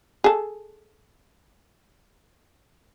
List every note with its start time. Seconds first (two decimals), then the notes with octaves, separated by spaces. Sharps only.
0.24 G#4 A4